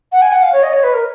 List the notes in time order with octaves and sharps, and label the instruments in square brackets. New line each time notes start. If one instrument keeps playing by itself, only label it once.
[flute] F#5
G#5
F#5
F5
C#5
D#5
C#5
B4
A#4